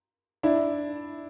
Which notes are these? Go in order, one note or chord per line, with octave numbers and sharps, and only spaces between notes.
D4 E4